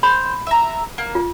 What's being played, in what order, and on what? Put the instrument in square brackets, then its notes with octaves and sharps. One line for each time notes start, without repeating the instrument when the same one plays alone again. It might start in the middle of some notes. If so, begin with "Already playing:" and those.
[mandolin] C5 [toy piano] B5
[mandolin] E5 A#5
A#3
[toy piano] F4